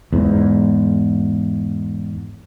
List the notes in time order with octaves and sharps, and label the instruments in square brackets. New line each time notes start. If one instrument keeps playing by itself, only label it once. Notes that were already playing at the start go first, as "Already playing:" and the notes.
[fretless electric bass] E2 G#2